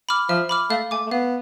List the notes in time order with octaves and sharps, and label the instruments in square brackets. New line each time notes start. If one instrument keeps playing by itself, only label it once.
[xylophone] B5 D6 F6
[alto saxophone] F3 [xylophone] E5
[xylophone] B5 D6 F6
[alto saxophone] A3 [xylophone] F5
[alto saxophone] A3 [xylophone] G#5 D6
[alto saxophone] A3
[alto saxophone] B3 [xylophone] F5